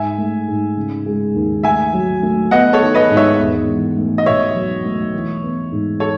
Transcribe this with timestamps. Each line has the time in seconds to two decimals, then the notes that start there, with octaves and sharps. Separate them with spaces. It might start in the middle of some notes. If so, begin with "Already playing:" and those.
Already playing: G#2 E5 G#5
0.18 A3
0.48 G#2
0.77 C#3
1.06 G#3
1.35 D#2
1.63 A3 E5 G#5
1.93 F#3
2.23 A3
2.51 B3 D#5 F#5
2.73 A4 C#5
2.80 D#3
2.95 B4 D#5
3.10 G#2
3.17 C#5 E5
3.39 E1
3.67 E2
3.97 A3
4.18 D#5
4.26 B2 C#5 E5
4.55 F#3
4.85 A3
5.14 E3
5.43 B3
5.72 G#2
6.00 A4 C#5